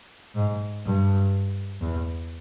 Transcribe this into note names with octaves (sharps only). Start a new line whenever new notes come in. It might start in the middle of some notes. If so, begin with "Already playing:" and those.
G#2
G2
E2